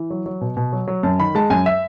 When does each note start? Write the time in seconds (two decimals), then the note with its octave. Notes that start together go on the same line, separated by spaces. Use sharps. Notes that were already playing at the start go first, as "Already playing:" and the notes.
Already playing: E3
0.10 F#3
0.26 F#3
0.41 B2
0.57 B2
0.73 F#3
0.88 F#3
1.03 F#2 A5
1.19 D#3 B5
1.35 G#3 A5
1.50 F#2 G#5
1.66 E5